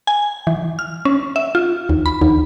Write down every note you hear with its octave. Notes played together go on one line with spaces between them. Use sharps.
G#5
E3
F6
C#4
E5
F4
D#2
B5
D#2